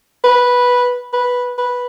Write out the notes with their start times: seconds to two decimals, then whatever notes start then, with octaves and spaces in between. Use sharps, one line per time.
0.24 B4
1.13 B4
1.58 B4